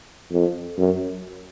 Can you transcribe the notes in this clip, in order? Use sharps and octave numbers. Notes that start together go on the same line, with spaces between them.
F2
F#2